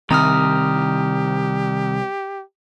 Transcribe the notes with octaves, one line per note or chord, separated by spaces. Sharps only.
C2 D#3 C4 G4 A#5 D#6 F6